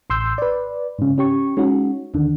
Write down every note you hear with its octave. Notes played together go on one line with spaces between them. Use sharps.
A1 C6 E6 G6
B4 D5
G#2 C#3
C#4 G4 C#6
G#3 C#4 D#4 F#4
D#2 D3 D#3